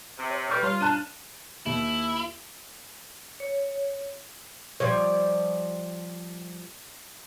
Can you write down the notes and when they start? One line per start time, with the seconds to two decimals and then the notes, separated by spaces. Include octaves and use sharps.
0.17 C3
0.30 C#5
0.49 G3 B4 C#6 F6
0.63 G3 F4 C#5 C6
0.81 D4 A5 F#6 D#7
1.66 D#2 E4
3.40 C#5
4.80 F3 G3 C#5